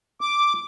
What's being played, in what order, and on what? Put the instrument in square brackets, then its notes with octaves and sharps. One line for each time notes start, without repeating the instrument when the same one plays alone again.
[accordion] D6